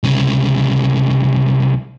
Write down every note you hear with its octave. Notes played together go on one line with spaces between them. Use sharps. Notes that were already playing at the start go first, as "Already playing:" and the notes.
C2 C#3